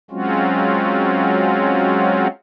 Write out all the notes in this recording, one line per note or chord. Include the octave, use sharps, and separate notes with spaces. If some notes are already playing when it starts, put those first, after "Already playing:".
F#3 G#3 C4 C#4 F4 F#4